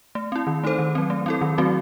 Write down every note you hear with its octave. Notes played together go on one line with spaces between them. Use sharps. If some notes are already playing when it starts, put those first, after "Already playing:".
A3
C4 E4
D#3
A3 D#4 A4 C5
D#3
F#3 C4
A3
C4 E4 A4
D#3
F#3 A3 C4 F#4